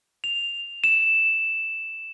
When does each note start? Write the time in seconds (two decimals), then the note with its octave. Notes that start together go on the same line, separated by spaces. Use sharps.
0.24 F7
0.84 E7